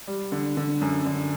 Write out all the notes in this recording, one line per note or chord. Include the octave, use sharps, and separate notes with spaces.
G3
D3
D3
F#2
D3